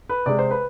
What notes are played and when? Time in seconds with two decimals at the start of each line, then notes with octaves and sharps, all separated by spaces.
0.10 B4
0.26 C3 G#3 D5
0.39 C5
0.51 B4